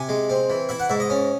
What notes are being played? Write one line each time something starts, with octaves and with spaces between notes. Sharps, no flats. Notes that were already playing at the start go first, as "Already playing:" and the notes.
Already playing: C3 G#5
G#3
C4
E3
E4 E5
F#5
G#2 E5
D#5
C#4